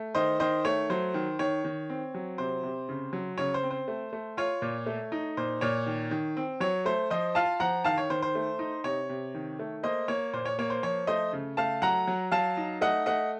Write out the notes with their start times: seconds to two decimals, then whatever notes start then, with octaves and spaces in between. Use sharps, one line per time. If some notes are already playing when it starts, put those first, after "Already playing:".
Already playing: A3
0.15 D#3 C5 D#5
0.40 D#3 C5 D#5
0.65 A3 C#5
0.90 F#3 C5
1.14 D#3
1.39 D#3 C#5
1.64 D#3
1.90 C4
2.14 F#3
2.38 C3 C5
2.63 C3
2.89 C#3
3.13 F#3
3.38 C#3 C#5
3.54 C5
3.63 C4
3.71 C5
3.88 A3
4.13 A3
4.37 F4 C#5
4.62 A#2
4.86 A3
5.12 D#4
5.37 A#2 C5
5.61 A#2 C#5
5.87 D#3
6.11 D#3
6.37 C4
6.60 F#3 C#5
6.86 A3 C5
7.10 F3 C5 D#5
7.35 F4 F5 A5
7.60 F3 F#5 A#5
7.84 D#3 F5 A5
7.98 C#5
8.10 D#3 C5
8.22 C5
8.35 A3
8.59 D#4
8.84 C3 C#5
9.09 C3
9.34 D#3
9.59 A3
9.83 A#3 C5 D#5
10.08 A#3 C#5
10.33 A#2 C5
10.46 C#5
10.59 A#3 C#5
10.70 C5
10.83 F3 C#5
11.07 A3 C5 D#5
11.33 C#3
11.57 A3 F5 A5
11.82 F#3 F#5 A#5
12.07 F#3
12.32 F#3 F5 A5
12.57 D#4
12.81 A3 D#5 F#5
13.06 A3 D#5 F#5